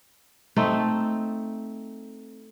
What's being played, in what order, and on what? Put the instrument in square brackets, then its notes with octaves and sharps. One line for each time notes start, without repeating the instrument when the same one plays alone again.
[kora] A3 C4 D#4